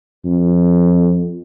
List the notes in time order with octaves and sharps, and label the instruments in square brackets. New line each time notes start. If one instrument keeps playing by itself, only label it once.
[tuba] F2